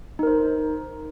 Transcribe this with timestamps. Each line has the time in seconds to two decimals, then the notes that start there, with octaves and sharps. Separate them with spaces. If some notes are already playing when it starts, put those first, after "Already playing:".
0.19 D#4
0.23 A#4
0.27 C5